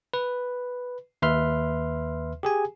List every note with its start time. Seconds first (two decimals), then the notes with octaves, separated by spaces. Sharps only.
0.14 B4
1.22 D#2 B4 E5 C6 F6
2.43 G4 G#4 G#5